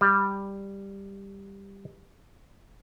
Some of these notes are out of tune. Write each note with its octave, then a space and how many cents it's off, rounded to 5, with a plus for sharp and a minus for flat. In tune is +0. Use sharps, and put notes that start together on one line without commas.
G3 +5